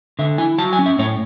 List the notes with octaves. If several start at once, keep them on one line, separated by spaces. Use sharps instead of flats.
D3 E5
E4 G#5
F#3 A5
G#5
C#4
E5
A2 C#5